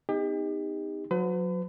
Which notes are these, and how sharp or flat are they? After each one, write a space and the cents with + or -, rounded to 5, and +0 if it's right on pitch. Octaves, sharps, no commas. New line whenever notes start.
B3 +40 D#4 +0 G4 +35
F#3 -25 B4 +45